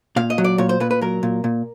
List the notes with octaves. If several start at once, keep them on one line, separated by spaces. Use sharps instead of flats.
A#2 F5
D#5
F#3
D5
A#2 C#5
C5
A#2 B4
B4
F#3 A#4
A#2
A#2